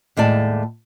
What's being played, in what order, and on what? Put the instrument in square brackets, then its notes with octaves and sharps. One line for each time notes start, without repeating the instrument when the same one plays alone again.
[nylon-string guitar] D#2 A2 G#3 D5 A5